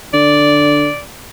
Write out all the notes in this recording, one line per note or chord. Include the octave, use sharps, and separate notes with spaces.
D3 D5